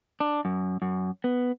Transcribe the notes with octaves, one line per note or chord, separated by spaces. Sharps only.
D4
F#2
F#2
B3